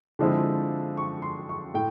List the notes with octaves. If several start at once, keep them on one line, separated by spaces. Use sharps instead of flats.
D3 F3 G#3 C4 E4
C#6
C6
C#6
A2 G5